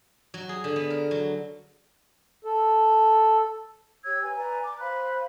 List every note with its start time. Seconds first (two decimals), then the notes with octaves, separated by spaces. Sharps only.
0.34 F#3
0.49 G#4
0.64 D3
0.76 B3
0.90 A#4
1.11 F#3
2.44 A4
4.04 G4 C#5 E6 G#6
4.21 B4 G#5
4.37 B4 D5 G#5 A#5
4.62 A#5 D6
4.79 C5 F5 B5 F#6